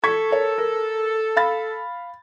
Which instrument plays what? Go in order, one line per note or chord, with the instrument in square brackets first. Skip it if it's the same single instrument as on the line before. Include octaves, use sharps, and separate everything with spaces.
[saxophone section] A4 [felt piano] C#6 G#6 B6
[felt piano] A#4 C#5
A#4
F5 B5 A6